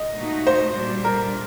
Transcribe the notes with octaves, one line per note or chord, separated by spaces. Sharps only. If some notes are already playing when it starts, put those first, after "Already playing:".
Already playing: D#5
A#2 A3 D#4 F#4
C5
A#2 G3 D4
A#4